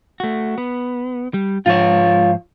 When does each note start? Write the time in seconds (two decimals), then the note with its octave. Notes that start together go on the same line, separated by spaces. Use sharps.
0.20 A3 F#4
0.58 B3
1.34 G3
1.66 G#2 F3 F4 C#5